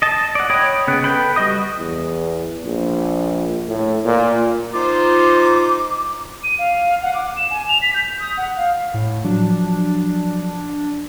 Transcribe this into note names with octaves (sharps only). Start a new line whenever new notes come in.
D#5 A5
D5 F#5
C#5 D#5 G5 B5 D#6
C#3 B3 F#6
A4 B4 G5 B5
G3 F#4 D#5 D#6
E2
A#1
A2
A#2
D#4 F4 C5 D6
D#7
F5
F#5
D6
E7
G#5
F7
B6
G6
D#6
F#5
F5
A2
F3 F#3 D4